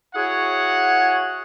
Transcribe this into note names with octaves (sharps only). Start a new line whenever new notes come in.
E4 F#4 G#4 C#5 F#5